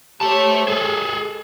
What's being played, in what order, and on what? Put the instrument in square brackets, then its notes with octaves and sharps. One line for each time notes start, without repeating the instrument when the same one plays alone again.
[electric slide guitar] A3 A5 [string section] G4 C5 C#5
[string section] G#3 [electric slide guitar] G#4 A4